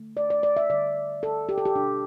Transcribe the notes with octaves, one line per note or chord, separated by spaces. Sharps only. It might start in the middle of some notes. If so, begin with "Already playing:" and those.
Already playing: D3 A3
D5
D5
D5
E5
D3 G3 D5
A4
G4
A4
G4
B2 G3 D4